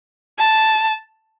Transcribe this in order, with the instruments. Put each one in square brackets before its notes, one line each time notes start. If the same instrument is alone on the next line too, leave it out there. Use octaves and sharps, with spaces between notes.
[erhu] A5